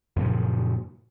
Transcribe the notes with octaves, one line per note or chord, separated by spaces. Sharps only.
F#2 A#2 C#3 F3